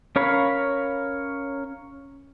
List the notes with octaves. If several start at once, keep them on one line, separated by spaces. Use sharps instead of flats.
C#4 A#4 C#5 F5 B5